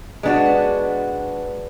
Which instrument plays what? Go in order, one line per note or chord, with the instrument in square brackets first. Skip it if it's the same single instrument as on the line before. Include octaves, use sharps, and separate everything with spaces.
[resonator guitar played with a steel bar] G#3 B3 D4 F#4 [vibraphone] B4
[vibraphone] B4